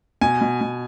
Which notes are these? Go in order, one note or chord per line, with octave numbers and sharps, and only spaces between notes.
B2 G#5
B2
B2